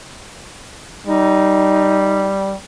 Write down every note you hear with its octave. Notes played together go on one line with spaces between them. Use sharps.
G3 D#4